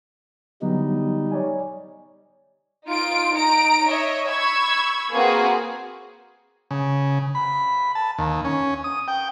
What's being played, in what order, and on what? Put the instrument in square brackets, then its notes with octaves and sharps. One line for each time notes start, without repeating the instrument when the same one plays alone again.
[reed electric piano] D3 F#3 B3 [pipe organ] G3 D#4
[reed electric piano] C#5 D5 G#5
[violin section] D#4 F4 D7
D#4 A#5 D7
C#5 D#5 E5
B5 C#6 E6 G#6
A#3 C4 F#4 G#4 B4
[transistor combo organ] C#3
B5
A5
D#2
C#4
D#6
G5